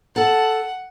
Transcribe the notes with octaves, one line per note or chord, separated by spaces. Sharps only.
A4 F#5 A5